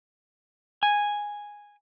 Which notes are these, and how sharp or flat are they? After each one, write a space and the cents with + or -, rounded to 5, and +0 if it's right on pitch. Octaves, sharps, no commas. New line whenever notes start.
G#5 -5